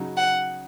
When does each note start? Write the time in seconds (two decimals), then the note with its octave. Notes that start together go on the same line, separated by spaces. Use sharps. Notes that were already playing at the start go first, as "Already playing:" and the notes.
Already playing: C#3 F#3 D#4 F#4
0.17 F#5